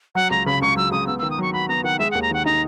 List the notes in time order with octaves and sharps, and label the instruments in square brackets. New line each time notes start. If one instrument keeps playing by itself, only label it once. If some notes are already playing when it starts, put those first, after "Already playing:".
[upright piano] F#3 [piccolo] F#5
[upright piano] C#2 [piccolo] A#5
[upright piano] C#3 [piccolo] B5
[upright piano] C#2 [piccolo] C#6
[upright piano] F#3 [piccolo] E6
[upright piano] C#2 [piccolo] D#6
[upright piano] B3 [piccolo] E6
[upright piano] D#3 [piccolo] E6
[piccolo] D#6
[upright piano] F#3 [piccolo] C#6
[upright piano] F#4 [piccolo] B5
[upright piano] B3 [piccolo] A#5
[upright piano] D#3 [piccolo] F#5
[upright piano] G#3 [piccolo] E5
[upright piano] D#2 [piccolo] F#5
[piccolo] A#5
[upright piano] D#3 [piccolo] F#5
[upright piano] D#4 [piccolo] A#5